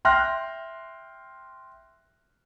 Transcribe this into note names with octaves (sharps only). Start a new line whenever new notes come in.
E5 G5 C6 F6 F#6 A#6